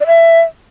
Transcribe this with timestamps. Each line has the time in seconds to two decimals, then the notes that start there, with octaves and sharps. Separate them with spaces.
0.01 D5
0.07 E5